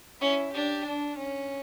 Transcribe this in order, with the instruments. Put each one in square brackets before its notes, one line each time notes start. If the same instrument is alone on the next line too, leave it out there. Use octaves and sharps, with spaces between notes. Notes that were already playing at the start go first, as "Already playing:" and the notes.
[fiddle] C#4 [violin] E4
[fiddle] D4 [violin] G4
[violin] D4
C#4